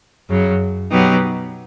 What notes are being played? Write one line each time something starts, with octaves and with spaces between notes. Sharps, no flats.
F#2 C#3 F#3
B2 F#3 B3 D#4 G4